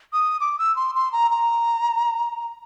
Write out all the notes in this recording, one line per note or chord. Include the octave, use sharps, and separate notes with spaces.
D#6
D6
E6
C6
C6
A#5
A#5